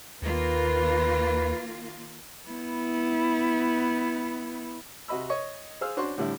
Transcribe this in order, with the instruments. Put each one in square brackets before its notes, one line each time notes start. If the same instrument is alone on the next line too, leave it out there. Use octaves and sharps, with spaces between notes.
[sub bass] D#2 [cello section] D#3 A#3 F4 [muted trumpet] B4
[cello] B3 E4
[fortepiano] C3 F#4 D#5 B5 E6
C#5 D#5 C#6
G#4 C5 F5 E6 F6
C#4 D4 F#4 C5 C6 C#6
A2 D3 G3 D4 E4